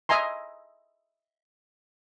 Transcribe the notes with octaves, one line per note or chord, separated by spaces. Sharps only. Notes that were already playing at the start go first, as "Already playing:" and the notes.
D#5 E5 G#5 A#5 C6